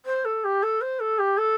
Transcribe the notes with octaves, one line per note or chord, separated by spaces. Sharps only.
C5
A4
G4
A4
C5
A4
G4
A4